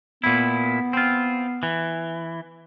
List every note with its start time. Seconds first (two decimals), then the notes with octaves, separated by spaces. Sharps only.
0.24 A#2 B3 E4
0.93 C4 F4
1.63 E3